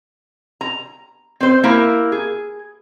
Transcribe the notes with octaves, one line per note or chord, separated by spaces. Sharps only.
A#5
C4 C5
A#3 E4 G4 A#4
G#4